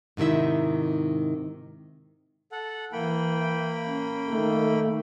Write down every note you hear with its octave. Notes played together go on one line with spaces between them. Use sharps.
G#2 C3 D#3 E4 E5
A4 F#5
E3 A#3 G5 B5
C#4
D#3 A3